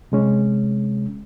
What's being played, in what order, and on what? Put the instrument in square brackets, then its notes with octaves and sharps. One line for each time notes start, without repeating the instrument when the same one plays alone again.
[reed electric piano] C3 G#3 C#4